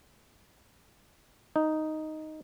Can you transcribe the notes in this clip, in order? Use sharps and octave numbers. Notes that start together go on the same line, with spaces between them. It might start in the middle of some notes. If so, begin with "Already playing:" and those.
D#4